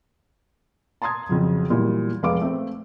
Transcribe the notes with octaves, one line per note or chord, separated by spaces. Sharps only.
A5 A#5 C6 D#6 G#6
F2 C#3 F3 F#3
A#2 E3 F#3 G3
F1 G#3 F5 D6
A3 C4